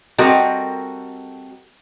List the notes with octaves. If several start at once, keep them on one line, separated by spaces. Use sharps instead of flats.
G3 C4 F#4 A4 A#4 D#5